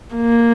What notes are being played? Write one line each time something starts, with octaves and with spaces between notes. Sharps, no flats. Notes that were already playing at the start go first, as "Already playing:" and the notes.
A#3